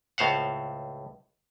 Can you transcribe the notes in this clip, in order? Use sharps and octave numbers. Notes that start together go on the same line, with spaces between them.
C#2 A2 C5 F5 F#5